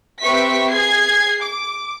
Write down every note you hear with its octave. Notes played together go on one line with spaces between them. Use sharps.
C4 G4 B4 E5 C#6 B6
G#4 G#6 C7
D6